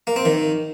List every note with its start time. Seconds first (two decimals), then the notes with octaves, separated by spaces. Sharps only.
0.07 A#3
0.16 C4
0.25 D#3